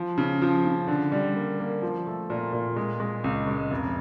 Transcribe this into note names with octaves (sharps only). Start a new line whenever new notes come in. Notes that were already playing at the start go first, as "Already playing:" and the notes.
Already playing: F3
C#3
F3
C#3
D3
G3
A#3
A#3
F3
A3
A#2
A#2
G#3
G#3
C#2
G#3
F1